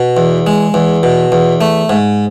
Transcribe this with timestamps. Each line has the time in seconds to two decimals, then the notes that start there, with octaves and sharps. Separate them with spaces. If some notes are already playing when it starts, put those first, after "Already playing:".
Already playing: B2
0.17 E2
0.47 G#3
0.74 E2
1.03 B2
1.32 E2
1.61 A3
1.90 G#2